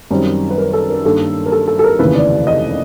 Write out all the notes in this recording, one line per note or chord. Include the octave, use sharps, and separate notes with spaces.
F#2 D#3 G3 C4
B4
A#4
A4
A#4
G2 D#3 G3 A#3 A4
A#4
A4
A4
A4
A#4
F1 D#2 C#3 E3 B4
D5
D#5